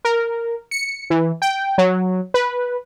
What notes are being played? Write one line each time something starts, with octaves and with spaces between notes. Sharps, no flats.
A#4
C#7
E3
G5
F#3
B4